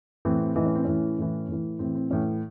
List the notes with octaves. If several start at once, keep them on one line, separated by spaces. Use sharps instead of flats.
A2 E3 C4
C4
A2 E3 D#4
C#4
C4
A2 E3 C#4
A2 E3
A2 E3
A2 E3 C4
C4
A2 E3 C#4